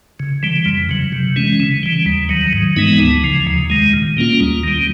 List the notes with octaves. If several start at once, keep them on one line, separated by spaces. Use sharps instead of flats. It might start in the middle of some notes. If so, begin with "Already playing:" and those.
C#3
E3 G3
F2
C#3 F#3
C3
E3 G#3 C#4
C#3
E3 G3
D#2
D#3 F#3
G#2
E3 G#3 B3 D#4
D2
C#3 F3
D#2
D#3 G#3
A#2
G3 A#3 C#4 F4
D#2
D#3 G3